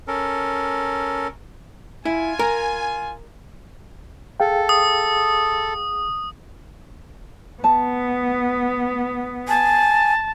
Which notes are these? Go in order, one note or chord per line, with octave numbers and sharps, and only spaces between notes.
C#4 A4 A#4
E4 F4 G#5
A#4
G#4 A4 F5 G5
D#6
B3 A5
G#5 A5